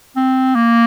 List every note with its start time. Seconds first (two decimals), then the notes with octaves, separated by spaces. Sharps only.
0.16 C4
0.55 A#3